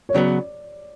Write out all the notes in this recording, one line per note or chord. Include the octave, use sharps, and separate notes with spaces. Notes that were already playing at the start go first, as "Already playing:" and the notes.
C#5
C#3 F#3 B3 D5